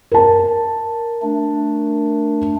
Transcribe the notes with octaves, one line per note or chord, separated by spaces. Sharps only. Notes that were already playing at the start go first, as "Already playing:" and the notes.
A#4 A5
A3 D4